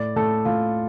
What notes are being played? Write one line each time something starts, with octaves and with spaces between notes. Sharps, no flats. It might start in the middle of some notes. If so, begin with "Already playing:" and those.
Already playing: A2 D5
A2 A4
A2 F4